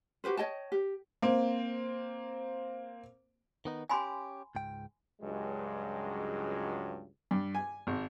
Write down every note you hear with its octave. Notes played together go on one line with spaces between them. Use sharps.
F#4 G4 B4 C5
C#5 D#5 G5 A5
G4
A#3 C4
D#3 B3 D#4
C#4 G4 G#5 B5 C6
C#2 G#2 G5
C#2 G2 F#3 G#3
G2
G#5
G#1